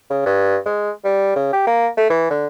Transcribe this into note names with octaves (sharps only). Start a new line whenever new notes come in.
C#3
G2
G#3
G3
C#3
G4
A#3
A3
E3
D3